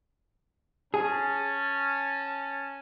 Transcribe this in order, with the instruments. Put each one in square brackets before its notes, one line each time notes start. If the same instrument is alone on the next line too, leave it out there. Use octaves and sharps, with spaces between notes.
[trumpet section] C#4 A5 [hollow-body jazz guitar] G#4